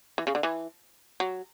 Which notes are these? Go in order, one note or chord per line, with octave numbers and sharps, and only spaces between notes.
E3
C#3
D3
E3
F#3